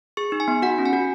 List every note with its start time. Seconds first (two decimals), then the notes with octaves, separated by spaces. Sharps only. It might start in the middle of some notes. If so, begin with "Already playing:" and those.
0.17 G#4 C#6
0.32 D#4
0.40 G#5
0.48 B3
0.62 F#4 F#5
0.78 C#4
0.86 G#5
0.93 F#4